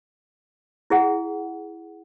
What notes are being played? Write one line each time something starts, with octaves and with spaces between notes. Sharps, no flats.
E4 G#4 F#5